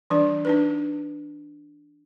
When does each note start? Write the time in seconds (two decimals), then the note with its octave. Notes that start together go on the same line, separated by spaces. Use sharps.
0.10 E3 G3 D4 D5
0.45 D4 D#4 B4